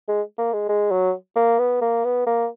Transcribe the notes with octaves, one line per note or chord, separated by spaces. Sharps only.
G#3
A#3
G#3
G#3
F#3
A#3
B3
A#3
B3
A#3